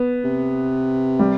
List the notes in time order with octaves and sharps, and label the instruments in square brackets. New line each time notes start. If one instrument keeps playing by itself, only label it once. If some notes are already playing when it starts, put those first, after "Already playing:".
Already playing: [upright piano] B3
[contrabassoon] C3
[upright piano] G3